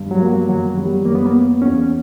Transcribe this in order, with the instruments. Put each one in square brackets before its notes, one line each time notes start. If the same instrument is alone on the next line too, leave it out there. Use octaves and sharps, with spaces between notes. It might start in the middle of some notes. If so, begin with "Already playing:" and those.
Already playing: [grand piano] G2
[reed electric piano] F#3
[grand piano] A#3
[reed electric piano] F#3
[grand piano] F#2 [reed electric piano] F#3
[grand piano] G3
[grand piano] F#2 [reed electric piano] A#3
[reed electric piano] B3
A#3
[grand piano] B3
[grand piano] E2 [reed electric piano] C#4